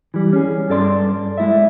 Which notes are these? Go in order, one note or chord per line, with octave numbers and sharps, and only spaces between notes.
E3 G3
C#4 G#4
G2 A4 D5 C6
G#3 E4 D5 E5